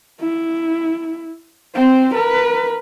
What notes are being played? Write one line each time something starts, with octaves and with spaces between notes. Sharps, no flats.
E4
C4 C5
A#4 B4